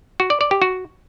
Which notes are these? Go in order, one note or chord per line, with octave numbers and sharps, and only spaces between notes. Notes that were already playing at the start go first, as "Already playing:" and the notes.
F#4
D5
D5
G4
F#4